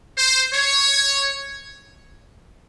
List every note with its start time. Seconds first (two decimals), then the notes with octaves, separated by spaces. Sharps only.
0.18 C5
0.54 C#5